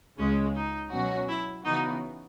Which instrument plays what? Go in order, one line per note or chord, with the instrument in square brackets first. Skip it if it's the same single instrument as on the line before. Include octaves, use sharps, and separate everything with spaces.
[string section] C#2 C#3 G#3 [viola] C#4
[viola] D#4
[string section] B2 F#3 C#4 F#4
[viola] E4
[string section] C#3 E3 B3 F#4 [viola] D#4